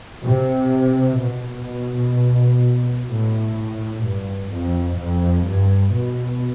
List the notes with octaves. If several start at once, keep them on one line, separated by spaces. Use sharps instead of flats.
C3
B2
A2
G2
F2
F2
G2
B2